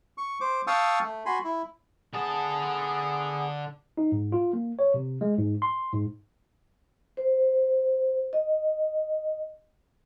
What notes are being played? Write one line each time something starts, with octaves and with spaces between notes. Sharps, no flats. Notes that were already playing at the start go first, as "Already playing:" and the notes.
C#6
C5 D6
F5 G5 A5 C#6 D#6 E6
A3
F#4 G#5 B5 C6
E4
D3 B3 G#4 A5
D#4
G#2
F4
A#3
C#5
C3
G#3
G#2
C6
G#2
C5
D#5